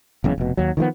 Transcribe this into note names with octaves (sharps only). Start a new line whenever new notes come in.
F#1 E2 C#3
F1 B2
D#2 F#3
D#3 F3 G#3 B3